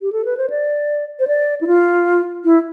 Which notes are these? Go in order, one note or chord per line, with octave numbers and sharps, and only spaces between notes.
G4
A4
B4
C5
D5
C5
D5
E4
F4
E4